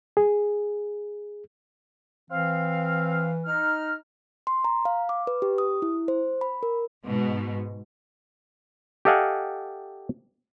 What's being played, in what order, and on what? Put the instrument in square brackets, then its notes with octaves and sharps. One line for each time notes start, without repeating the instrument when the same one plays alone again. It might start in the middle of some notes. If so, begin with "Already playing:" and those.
[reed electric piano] G#4
[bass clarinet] E3 [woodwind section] C4 F5
[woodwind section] D#4 F6
[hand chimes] C6
A#5
F5
D6
B4
G4
D#6
E4
C5
B5
A#4
[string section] G#2 B2
[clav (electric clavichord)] G4 A4 D#5 F5 F#5 G#5